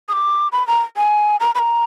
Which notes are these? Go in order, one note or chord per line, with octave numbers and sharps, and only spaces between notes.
D#6
D6
B5
A#5
G#5
A#5
B5
A#5